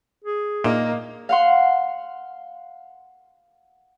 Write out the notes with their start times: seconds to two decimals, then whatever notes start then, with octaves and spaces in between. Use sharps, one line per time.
0.25 G#4
0.64 A#2 A#3 D#4
1.29 F5 F#5 C6